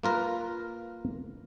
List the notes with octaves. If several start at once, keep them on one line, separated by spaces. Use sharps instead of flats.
A#3 F4 A#4 B4